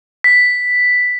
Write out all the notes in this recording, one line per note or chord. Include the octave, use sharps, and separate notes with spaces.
B6